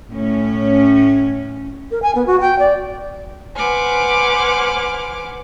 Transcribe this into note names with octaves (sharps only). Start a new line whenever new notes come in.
A2 C#4
A#4
G#5
B3
F#4
G5
D5
B4 C5 F#5 G#5 D6 F6